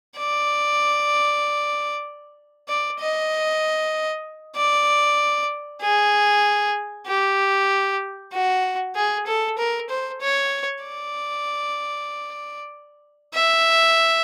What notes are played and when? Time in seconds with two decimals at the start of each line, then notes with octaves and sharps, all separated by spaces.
0.18 D5
2.68 D5
3.00 D#5
4.56 D5
5.82 G#4
7.07 G4
8.33 F#4
8.96 G#4
9.26 A4
9.58 A#4
9.89 C5
10.21 C#5
10.84 D5
13.34 E5